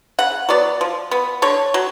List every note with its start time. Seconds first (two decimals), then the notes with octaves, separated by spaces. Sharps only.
0.19 C#3 F#5
0.49 F#3 B3 D5
0.81 F3
1.11 B3
1.42 D3 C#5
1.74 F#3